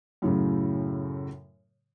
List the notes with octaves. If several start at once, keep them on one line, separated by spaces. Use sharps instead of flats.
F#2 A2 C#3